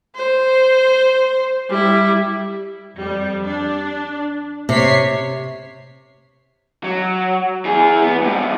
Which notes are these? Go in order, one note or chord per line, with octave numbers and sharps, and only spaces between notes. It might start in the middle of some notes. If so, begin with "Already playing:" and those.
C5
G3 E4
F2 G3
D4
C3 C#5 B6 C7
F#3
E3 G#4
B3
G2 F3